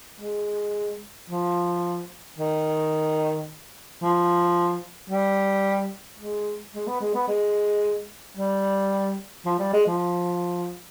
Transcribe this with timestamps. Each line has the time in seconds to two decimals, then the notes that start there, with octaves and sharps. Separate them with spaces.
0.20 G#3
1.30 F3
2.39 D#3
4.02 F3
5.10 G3
6.19 G#3
6.74 G#3
6.87 B3
7.01 G#3
7.14 B3
7.28 G#3
8.37 G3
9.46 F3
9.59 G3
9.74 G#3
9.87 F3